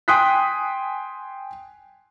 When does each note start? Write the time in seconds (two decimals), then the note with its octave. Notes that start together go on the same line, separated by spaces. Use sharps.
0.08 G5 G#5 C6 D#6 F#6 B6